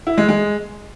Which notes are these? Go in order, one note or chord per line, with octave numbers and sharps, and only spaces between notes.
E4
G#3
G#3